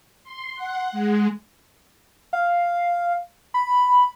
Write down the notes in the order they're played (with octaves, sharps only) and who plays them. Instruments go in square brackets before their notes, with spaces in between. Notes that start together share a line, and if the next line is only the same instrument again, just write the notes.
[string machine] C6
F#5
G#3
[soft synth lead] F5
B5